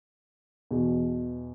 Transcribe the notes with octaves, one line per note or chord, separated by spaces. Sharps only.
E2 B2